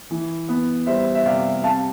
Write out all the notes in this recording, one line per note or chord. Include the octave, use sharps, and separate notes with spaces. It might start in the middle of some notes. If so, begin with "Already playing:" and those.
E3
B3
G3 C5 E5
E5
C3 D5 F5
C4 F5 A5